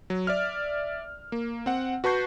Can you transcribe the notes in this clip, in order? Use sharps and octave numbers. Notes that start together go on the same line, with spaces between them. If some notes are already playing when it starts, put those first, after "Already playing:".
F#3
D5 E5 F6
A#3
C4 F#5
F#4 B4 A5 C#6 G6 C7